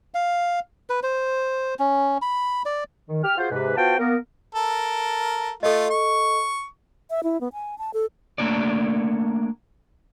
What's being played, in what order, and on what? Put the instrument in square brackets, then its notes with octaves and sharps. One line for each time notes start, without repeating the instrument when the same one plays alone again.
[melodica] F5
B4
C5
C#4
B5
D5
[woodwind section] D#3
G4 F6
F4 F#4 G#4 C5
G#2 C3 B4
B3 F4 F#4 C5 G5 A5
A#3 B3 A#4
[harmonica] A4 A#4
[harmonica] A3 F4 [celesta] A4 D#5
[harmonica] C#6
[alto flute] E5
E4
B3
G#5
A5
A4
[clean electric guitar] A3 A#3 D4 C#5 D5